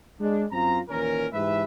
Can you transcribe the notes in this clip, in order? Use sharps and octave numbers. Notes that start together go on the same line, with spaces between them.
G#3 D4
F#2 C4 F4 A#5
D#2 A#2 E3 C#4 A#4
G#2 E3 G4 B4 E5